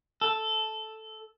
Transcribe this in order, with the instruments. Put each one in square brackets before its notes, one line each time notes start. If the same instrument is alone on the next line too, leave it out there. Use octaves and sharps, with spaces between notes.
[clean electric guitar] A4